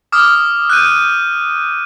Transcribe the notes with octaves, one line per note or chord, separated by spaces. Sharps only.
D6 D#6 F6
F#6 G6 D#7